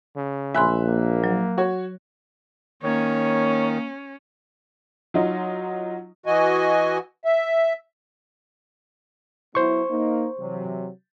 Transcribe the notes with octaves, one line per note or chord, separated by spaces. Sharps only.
C#3
A#1 E5 G#5 B5 C6 F#6
A#3
F#3
F#4 C#5
D#3 A#3 C#4 C#5
F#3 D#4 F4
E3 F#4 D#5 G#5
E5
F#3 B3 E4 C5 C#6
A#3 D#4
C3 E3 F#3